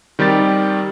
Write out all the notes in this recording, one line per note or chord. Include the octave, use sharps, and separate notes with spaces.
D#3 G3 C4 G4 A6